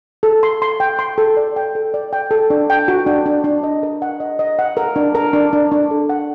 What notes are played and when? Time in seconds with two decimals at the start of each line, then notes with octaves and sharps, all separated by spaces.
0.23 A4
0.43 C6
0.62 C6
0.80 G5
0.99 C6
1.18 A4
1.37 D5
1.56 G5
1.75 A4
1.94 D5
2.13 G5
2.31 A4
2.50 D4
2.70 G5
2.88 F#4
3.07 D4
3.26 D4
3.44 D4
3.63 D#5
3.83 A#4
4.02 F#5
4.20 D#5
4.39 D#5
4.59 F#5
4.77 A#4
4.96 D4
5.15 A#4
5.33 D4
5.53 D4
5.72 D4
5.91 A4
6.09 F#5